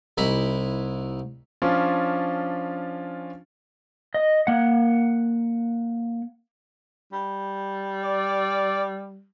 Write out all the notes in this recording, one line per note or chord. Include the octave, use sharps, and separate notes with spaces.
C2 D#4 E4 B5
F3 C#4 D4 F4
D#5
A#3 F#5
G3
D5